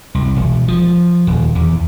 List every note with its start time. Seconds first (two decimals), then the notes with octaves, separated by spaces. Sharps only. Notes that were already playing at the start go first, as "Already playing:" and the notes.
0.15 C2
0.36 E1
0.68 F3
1.27 D#1
1.55 E2